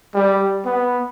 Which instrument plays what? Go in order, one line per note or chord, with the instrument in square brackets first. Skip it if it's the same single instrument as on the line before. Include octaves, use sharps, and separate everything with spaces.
[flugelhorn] G3
B3